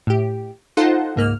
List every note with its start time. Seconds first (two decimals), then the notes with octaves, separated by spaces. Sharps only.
0.07 A2 G4
0.77 D#4 F4 A4 C5 F#5
1.16 C#2 G#2 A#3 F6